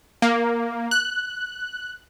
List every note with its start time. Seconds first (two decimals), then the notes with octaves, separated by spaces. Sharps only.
0.22 A#3
0.91 F#6